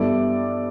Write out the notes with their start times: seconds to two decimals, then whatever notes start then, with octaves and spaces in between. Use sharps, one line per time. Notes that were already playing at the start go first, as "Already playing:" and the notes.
Already playing: G2 G3 B3 E4 A4 D5